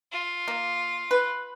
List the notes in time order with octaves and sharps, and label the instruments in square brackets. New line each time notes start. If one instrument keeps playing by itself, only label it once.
[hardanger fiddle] F4
[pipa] A#3
B4